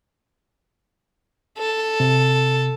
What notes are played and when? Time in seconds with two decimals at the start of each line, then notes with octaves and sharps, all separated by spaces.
1.58 A4
2.00 C3